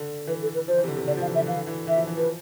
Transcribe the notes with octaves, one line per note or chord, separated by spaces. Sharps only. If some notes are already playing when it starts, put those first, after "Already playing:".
Already playing: D3
E3 B4
A4
B4
F3 C5
E3
C3
D3
C3
D3 D5
F3
F5
E3
E5
D3
E3 F5
D3
E3
E3 E5
F3
E3
F3 B4